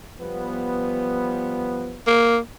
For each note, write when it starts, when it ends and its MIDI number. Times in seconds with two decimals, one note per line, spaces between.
0.19 2.00 53
0.19 2.00 55
0.19 2.00 59
2.07 2.38 58